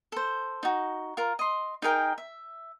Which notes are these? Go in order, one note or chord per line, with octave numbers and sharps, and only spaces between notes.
A4 C5
D#4 F#4
F4 A#4
D#5 C6
D#4 G#4 A#4 G5
E5